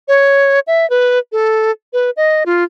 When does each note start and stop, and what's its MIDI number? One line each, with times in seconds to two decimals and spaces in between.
0.08 0.60 73
0.67 0.88 76
0.90 1.19 71
1.32 1.71 69
1.93 2.10 71
2.17 2.44 75
2.46 2.64 65